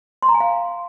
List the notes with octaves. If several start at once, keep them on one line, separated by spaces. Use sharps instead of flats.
C6
A#5
G#5
F5